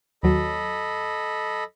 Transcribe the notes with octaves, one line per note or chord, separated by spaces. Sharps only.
D#2 F#3 A4 D#5 B5